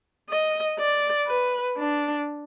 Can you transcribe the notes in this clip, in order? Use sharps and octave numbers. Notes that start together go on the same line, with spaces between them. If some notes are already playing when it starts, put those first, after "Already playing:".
D#5
D5
B4
D4